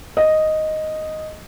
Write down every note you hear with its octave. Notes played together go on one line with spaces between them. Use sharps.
D#5